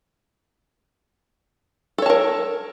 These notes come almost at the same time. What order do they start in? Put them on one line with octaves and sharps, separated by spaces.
A4 C#5 A5 A#4